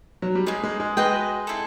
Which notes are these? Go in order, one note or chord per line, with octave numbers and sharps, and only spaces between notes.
F#3
G3
G#3 A#3 D#4 G#4
G#3
G#3
G#3 F#4 B4 D#5 G5
C4 E4 A4